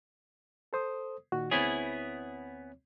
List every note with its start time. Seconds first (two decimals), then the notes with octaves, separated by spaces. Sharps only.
0.73 A4 C5 D#6
1.32 A#2 D#3 F#4
1.51 D2 B3 C4 E4 G#4 C#5